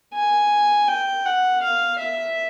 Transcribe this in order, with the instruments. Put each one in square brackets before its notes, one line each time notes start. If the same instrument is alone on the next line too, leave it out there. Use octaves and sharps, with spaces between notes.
[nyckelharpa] G#5
G5
F#5
F5
E5